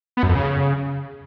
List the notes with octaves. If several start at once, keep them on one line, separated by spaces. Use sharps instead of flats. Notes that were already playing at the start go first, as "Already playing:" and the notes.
B3
F#2
F2
C#3